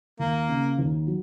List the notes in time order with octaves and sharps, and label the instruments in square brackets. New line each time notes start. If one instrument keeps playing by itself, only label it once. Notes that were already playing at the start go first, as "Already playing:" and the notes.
[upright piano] D#2 [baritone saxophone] A#3
[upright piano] C#3
D#2
F#3